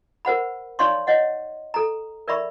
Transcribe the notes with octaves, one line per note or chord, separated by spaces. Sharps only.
A#4 C5 F#5 B5
D#4 C#5 D5 F5 C6 C#6
C#5 D#5 F#5
A4 A#5
A#4 D5 E5 B5 C#6